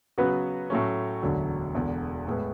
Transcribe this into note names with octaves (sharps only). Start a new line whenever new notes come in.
C#3 F#3 B3 F#4 B4
A2 F#3 A3 C#4
E1 D2 D3 F#3
E1 E2 D3
A2 G#3 B3